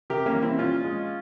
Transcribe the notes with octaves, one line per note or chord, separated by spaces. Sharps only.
C3 G4 A#4
A#3 C#4
E3 G3
C4 E4
A#2 C#4 F4
F3 G#3